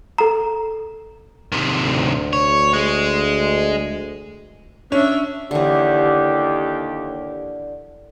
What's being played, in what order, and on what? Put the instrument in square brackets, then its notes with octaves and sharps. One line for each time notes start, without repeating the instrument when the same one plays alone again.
[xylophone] A4 A#5
[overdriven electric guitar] C3 D#3
[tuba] D2
[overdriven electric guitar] C#5
G#3
[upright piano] C#4 [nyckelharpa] D4 E5
[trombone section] D#2 G4 [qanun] D3 E3